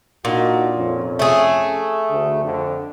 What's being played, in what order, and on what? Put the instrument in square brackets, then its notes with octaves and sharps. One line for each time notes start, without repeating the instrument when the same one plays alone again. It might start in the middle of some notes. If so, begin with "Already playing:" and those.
[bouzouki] A#2 [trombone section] D4 D#4 F#4
[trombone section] F2 C#4
[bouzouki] A3 G#4
[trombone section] D2
F2 D3